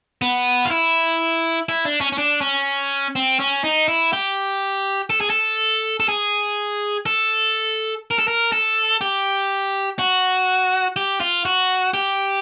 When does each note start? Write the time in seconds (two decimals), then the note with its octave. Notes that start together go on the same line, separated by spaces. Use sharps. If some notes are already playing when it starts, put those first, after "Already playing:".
0.22 B3
0.65 F4
0.71 E4
1.69 E4
1.85 D4
2.01 C#4
2.13 C#4
2.18 D4
2.41 C#4
3.16 C4
3.40 C#4
3.64 D#4
3.88 E4
4.13 G4
5.10 A4
5.21 G#4
5.30 A4
6.00 A4
6.09 G#4
7.06 A4
8.11 A#4
8.19 A4
8.28 A#4
8.52 A4
9.01 G4
9.99 F#4
10.96 G4
11.20 F4
11.45 F#4
11.94 G4